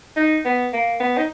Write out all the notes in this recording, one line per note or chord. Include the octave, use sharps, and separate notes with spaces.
D#4
B3
A#3
B3
D#4